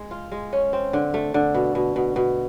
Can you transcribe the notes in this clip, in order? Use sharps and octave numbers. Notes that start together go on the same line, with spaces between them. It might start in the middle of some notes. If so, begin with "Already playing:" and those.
Already playing: G#3
F4
G#3
C#4
C4
D3
A3
D3
B2
B2
B2
B2